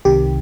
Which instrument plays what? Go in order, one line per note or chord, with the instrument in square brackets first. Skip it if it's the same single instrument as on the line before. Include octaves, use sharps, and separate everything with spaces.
[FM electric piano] C2 C3 D#3 G4